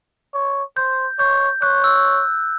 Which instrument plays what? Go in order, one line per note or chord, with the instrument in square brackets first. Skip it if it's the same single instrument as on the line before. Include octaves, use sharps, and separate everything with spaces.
[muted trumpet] C#5
[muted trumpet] C5 [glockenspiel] G6
[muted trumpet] C#5 [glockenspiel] G6
[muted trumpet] C#5 [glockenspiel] F#6
[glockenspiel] E6